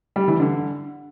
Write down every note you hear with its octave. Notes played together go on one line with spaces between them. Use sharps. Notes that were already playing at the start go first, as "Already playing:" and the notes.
G3
E3
D3